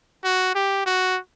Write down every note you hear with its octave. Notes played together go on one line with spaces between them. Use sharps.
F#4
G4
F#4